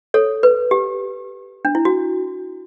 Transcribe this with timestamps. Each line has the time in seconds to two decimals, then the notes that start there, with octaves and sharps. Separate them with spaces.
0.14 A4 C#5
0.43 B4
0.71 G4
1.65 D4
1.75 E4
1.85 F#4